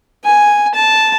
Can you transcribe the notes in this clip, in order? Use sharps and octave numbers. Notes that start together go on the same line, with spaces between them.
G#5
A5